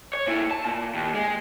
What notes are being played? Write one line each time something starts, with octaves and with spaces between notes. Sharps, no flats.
C#5
A#2 E4
A5
A#2
D#2
G#3